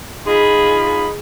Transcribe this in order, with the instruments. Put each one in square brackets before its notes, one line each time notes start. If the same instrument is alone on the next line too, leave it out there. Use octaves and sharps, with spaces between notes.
[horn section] D#4 F4 B5 [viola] G#4